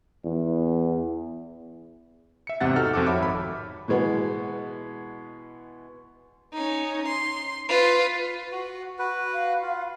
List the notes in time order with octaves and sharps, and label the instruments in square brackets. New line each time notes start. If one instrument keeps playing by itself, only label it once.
[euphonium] E2
[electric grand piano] E5 C#7
E2 G#2 C3 F#5 A6
D#4 F#4 A4 F6
F2 F3 F#4 A4 F#5 D6
C#5 E5 B5 D6 F6
G#1 B5
[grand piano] B2 E3 G#3 B3
[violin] C#4 D#4
C6
F4 B4
[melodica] F#4
F#4 B4
[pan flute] F5
[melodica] F4